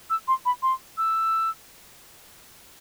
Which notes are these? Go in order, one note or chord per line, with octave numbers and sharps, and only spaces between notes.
E6
C6
B5
C6
E6